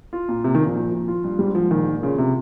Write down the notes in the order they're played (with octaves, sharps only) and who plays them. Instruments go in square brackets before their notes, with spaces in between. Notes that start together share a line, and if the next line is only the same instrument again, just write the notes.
[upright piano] F4
A#2
[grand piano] C3 [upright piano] A#3
[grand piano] D#3
[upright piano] A#1
[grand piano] F3
[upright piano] A#2
A#2
F4
G2
[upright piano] G#2 [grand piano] G3
[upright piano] G#2 [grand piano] F3
[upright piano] A#1 [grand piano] D#3
[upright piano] A#1
[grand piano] C#3 [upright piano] F4
[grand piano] C3